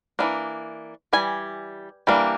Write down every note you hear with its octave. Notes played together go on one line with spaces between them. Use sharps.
E3 G3 A#3 D4
E3 G3 G#5
E3 G3 A#3 D4